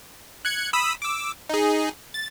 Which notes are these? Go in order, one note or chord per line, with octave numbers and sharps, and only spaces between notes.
F#6 G#6 C#7
B5 D#6 E6
D6 E6
D#4 G#4
A6